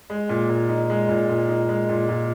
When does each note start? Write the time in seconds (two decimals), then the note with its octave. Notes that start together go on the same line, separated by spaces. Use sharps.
0.10 G#3
0.29 A#2
0.49 A#2
0.69 D#4
0.90 G#3
1.09 A#2
1.29 A#2
1.49 D#4
1.69 G#3
1.89 A#2
2.09 A#2